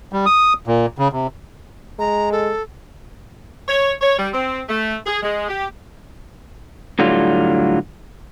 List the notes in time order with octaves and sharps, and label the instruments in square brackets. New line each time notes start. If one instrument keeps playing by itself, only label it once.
[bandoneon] G3
D#6
A#2
C#3
C3
[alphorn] G#3 [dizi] A#5
[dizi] A4
[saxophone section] C#5
C#5
G3
C4
A3
G#4
G#3
G4
[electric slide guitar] A2 D3 F#3 G3 F4